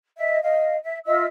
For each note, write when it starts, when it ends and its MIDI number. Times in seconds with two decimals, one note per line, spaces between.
0.18 0.38 75
0.18 0.38 76
0.43 0.76 75
0.43 0.76 77
0.83 0.97 76
1.05 1.25 65
1.05 1.25 75
1.05 1.25 76
1.05 1.25 88